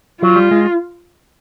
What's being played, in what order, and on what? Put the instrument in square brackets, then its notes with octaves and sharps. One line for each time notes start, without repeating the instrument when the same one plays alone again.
[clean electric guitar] F#3 [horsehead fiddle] F4
[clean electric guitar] G3
G#3